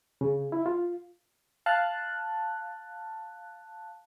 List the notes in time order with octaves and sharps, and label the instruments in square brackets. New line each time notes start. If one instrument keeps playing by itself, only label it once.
[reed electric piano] C#3
E4
F4
[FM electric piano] F5 A5 F#6